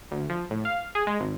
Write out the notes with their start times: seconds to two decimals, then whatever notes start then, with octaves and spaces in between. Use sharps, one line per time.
0.11 D2
0.29 F3
0.51 A2
0.65 F5
0.95 G#4
1.07 G#3
1.20 G#1